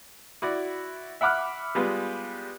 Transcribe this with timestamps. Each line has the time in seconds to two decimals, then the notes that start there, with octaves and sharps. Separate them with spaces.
0.42 E4 F#4 D5
1.21 E5 F#5 B5 D6 F6 F#6
1.75 G3 G#3 B3 F4